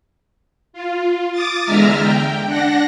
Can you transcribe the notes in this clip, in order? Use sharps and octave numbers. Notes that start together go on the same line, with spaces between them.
F4
D6 D#6 A6
E2 D3 G#3 E5 A#5 F6
G5
D4 F#5 A#6